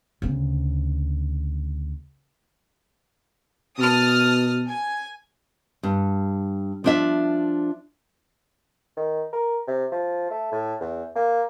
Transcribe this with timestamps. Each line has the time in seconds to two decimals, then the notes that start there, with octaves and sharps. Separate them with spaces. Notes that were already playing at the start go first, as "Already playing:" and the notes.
0.22 D2 C#3
3.78 B2 A5 D#6 F6
4.68 G#5
5.83 G2
6.84 F3 D4 E5
8.97 D#3
9.32 A#4
9.68 C3
9.92 F3
10.30 A3
10.52 A2
10.80 E2
11.16 A#3